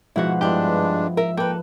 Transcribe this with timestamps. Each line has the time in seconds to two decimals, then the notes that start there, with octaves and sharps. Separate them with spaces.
0.16 G#2 B2 F3 E4 F#4 F#5
0.41 G2 G#3 B3 D4 E4 G4
1.17 A#4 E5
1.37 A#3 A4 B4 G5